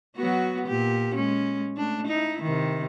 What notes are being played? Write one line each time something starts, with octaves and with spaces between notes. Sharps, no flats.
F#3 B3 F#4
A#2 G4
G#3 C#4
A3 D4
D#4 E4
C3 D#3